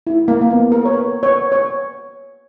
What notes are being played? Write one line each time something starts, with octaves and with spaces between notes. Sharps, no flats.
E4
A#3
A#3
B3
A#4
C#5
B4
C#5
C#5